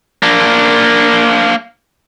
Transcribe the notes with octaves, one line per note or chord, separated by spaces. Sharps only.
A#3 D4